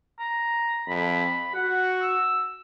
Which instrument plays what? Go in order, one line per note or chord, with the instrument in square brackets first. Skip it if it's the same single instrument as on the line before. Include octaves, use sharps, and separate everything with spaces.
[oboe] A#5
[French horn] F2 [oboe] B5
[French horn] F#4 [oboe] F#5
[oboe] E6